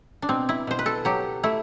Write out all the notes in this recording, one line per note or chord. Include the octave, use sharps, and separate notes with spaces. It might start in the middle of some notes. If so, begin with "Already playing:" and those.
D4
B2 C4
E4
B2 C5
B4
A4
F#3 G4
A3 E4